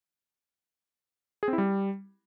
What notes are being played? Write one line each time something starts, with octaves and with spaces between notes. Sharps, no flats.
G#4
C4
E4
G3